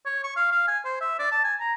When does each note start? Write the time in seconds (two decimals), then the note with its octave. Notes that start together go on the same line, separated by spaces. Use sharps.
0.06 C#5
0.24 C#6
0.36 F5
0.52 F5
0.68 G#5
0.85 C5
1.01 E5
1.19 D5
1.32 A5
1.44 G#5
1.60 A#5